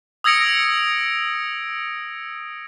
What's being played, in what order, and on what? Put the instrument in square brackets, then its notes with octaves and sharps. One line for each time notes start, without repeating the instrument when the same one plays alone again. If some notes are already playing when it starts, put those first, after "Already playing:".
[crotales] D#6 E6 G#6 A#6 C#7 D7